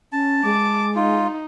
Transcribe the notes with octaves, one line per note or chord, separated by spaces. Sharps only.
C#4 A5
G#3 D6
D#4 F4